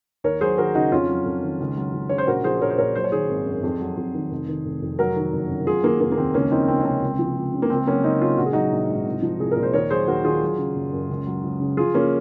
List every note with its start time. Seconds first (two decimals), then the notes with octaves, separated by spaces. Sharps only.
0.24 D#2 A#4 C#5
0.41 F#3 G#4 C5
0.58 D#2 F#4 A#4
0.75 C#3 D#4 F#4
0.92 F2 C#4 F4
1.09 F#3
1.26 F2
1.43 D#3
1.60 C#2
1.77 F#3
1.94 C#2
2.09 C#3 C#5
2.18 C5
2.27 A#1 F#4 A#4
2.44 F3 G#4 C5
2.61 A#1 A#4 C#5
2.70 C5
2.78 A#2 A#4 C#5
2.95 F#3 C5
3.04 C#5
3.12 D#3 G#4 C5
3.29 G#1
3.46 F#2
3.63 F2
3.80 F#3
3.97 F2
4.14 D#3
4.31 F1
4.48 D#3
4.65 F1
4.82 F2
4.99 F#3 F#4 A#4
5.16 D#3
5.33 F#1
5.50 F#2
5.67 F#3 F4 G#4
5.84 D#3 A#3
6.01 F1 A#3
6.12 A#3
6.18 D#2 C4
6.34 C#2 A#3 C#4
6.51 F3 C4 D#4
6.68 C#2 C4
6.80 C#4
6.85 C3 C4
7.02 C#2
7.19 F3
7.36 C#2
7.54 C#3
7.62 A#3
7.70 C#2 C4
7.87 F#3 A#3 C#4
8.04 C#2 C4 D#4
8.21 C#3 C#4 F4
8.38 A#1 F#4
8.46 G#4
8.53 F#3 D#4 F#4
8.72 A#1
8.89 G#2
9.06 C2
9.22 F3
9.40 C2 G#4
9.51 A#2 A#4
9.63 C5
9.73 D#2 A#4 C#5
9.90 F#3 G#4 C5
10.08 D#2 F#4 A#4
10.24 D#3 F4 G#4
10.42 F#3
10.58 C#3
10.76 F#1
10.93 F#2
11.09 C#2
11.26 F#3
11.43 C#2
11.60 C#3
11.77 F3 F4 G#4
11.94 C#3 A#3 C#4